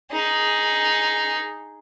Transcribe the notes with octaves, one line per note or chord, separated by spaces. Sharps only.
D#4 G#4